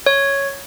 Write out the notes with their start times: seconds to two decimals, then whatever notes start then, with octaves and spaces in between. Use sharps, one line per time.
0.06 C#5